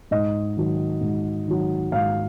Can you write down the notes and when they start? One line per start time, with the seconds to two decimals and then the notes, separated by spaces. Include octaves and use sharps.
0.11 G#2 D#5
0.57 D#3 F#3
1.01 G#2
1.48 D#3 F#3
1.92 G#2 F5